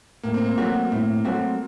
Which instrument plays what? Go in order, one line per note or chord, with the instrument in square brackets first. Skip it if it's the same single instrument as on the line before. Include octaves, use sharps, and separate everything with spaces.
[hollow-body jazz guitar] A2 [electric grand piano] A#3
[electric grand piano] C4
A#3
[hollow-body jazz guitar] F#3 A3 C4 F#4
A2
F#3 A3 C4 F#4